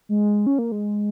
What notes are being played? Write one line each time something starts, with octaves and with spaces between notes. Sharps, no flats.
G#3
C#4
A#3
G#3